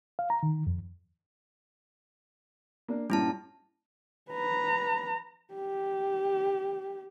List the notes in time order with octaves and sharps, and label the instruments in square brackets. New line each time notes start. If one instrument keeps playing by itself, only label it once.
[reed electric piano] F5
A#5
D#3
F2
[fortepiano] A#3 D4
[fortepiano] G2 A#2 G3 [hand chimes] C#4 E4 A5
[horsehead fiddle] B4 A#5
G4